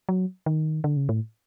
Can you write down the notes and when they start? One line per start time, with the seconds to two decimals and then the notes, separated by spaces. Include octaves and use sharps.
0.09 F#3
0.46 D#3
0.84 D3
0.97 C#3
1.09 A2